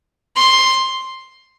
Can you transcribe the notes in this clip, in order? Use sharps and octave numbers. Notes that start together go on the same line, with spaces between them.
C6